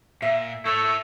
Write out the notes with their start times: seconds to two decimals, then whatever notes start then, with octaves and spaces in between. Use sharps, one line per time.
0.22 A#2 E5
0.65 A3 E4 C#5 E6